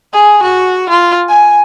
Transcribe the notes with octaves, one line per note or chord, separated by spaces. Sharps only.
G#4
F#4
F4
G#5